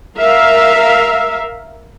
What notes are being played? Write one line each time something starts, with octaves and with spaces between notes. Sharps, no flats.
A#4 E5 F5